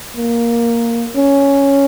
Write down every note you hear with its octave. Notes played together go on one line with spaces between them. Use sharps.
A#3
C#4